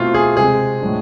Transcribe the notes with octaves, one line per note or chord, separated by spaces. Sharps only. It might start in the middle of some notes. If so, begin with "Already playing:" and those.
Already playing: B2 A3 C4 E4 F4
G#4
C3 G#3 C4 G#4
A2 F3 G#3 D4